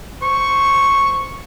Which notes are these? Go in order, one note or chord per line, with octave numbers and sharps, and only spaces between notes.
C5 C#6